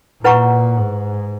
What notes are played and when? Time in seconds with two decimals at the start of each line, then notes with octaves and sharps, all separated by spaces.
0.24 A#2 E4 B4 F#5 A#5 C#6
0.77 G#2